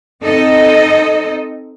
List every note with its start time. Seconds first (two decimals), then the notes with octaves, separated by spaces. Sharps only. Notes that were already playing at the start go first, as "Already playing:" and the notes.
0.23 C4 D#4 A4 D#5